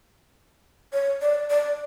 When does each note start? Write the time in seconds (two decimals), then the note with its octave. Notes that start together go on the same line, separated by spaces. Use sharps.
0.93 C#5
1.21 D5
1.50 D5